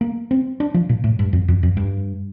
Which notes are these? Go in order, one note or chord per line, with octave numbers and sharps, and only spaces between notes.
A#3
C4
D4
F3
A#2
A2
G2
F2
F2
F2
G2